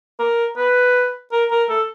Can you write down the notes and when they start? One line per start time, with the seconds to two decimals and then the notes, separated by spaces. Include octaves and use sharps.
0.19 A#4
0.57 B4
1.32 A#4
1.51 A#4
1.69 A4